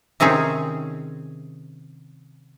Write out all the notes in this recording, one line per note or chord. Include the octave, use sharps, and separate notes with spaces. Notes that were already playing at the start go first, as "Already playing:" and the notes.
C3 D#3 C4 C#4 G#4